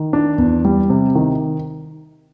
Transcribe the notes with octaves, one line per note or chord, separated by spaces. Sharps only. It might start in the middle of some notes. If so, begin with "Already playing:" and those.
Already playing: D#3
D4
E2
G3
C3
D#3